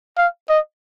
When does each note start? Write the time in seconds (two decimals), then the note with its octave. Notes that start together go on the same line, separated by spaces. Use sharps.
0.17 F5
0.49 D#5